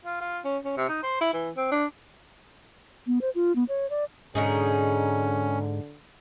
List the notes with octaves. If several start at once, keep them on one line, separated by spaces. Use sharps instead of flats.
F4
F4
C#4
C#4
C3
D#4
C5
E4
E3
C4
D4
B3
C5
F4
B3
C#5
D5
G#2 B2 D3 C#4 D#4 G#4